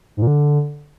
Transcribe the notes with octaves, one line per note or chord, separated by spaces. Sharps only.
G#2
A#2
D3